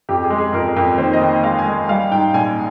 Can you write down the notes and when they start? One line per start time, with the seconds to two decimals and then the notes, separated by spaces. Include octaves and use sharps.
0.09 F2 G4
0.24 G#4
0.30 G#3
0.38 G#4
0.53 F2 A#4
0.76 F2
0.98 D#2 C5
1.13 D#5
1.21 D#2
1.43 G#3 F5
1.59 G#5
1.66 G#3
1.89 G3 F5
2.12 G#2 G5
2.34 A#1 G#5